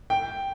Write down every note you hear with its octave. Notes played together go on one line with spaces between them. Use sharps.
G5